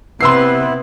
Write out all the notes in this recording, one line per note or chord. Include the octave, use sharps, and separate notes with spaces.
C3 B3 E4 B4 C6 E6 C7